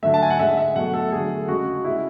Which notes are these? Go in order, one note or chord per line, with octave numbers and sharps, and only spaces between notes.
D3 F#3 A3 E5
A5
G#5
F#5
D3 G#3 E5
E5
B2 F#3 A3 F#5
A4
D3 F#3 A3 G#4
C#3 G#3 F#4
C#3 G#3 E4